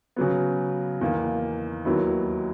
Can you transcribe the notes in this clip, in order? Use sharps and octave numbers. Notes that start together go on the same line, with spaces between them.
C#3 F#3 B3
E2 D#3 A#3
D#2 D#3 F#3 B3 E4